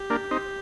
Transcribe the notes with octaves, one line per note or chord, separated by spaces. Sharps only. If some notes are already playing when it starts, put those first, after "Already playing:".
Already playing: G4
A#3 D4
C4 D#4